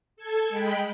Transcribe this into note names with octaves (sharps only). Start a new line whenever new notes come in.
A4 G#6
G#3 G5 B5